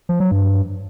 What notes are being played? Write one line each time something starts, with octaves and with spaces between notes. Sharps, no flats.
F3
F#3
G2